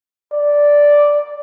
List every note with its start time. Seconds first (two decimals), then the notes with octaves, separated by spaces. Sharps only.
0.33 D5